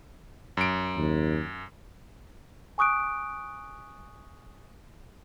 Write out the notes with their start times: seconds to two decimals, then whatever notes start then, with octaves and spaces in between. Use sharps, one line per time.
0.57 F#2 D7
0.97 D#2
2.78 G#5 C#6 D#6 F#6 D7